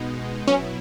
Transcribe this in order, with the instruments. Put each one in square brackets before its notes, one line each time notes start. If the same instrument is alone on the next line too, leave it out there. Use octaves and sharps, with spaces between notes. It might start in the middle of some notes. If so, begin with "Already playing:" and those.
Already playing: [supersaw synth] B2 G#3 B3 D#4
[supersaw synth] B2 F#3 B3 E4 [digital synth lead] C#4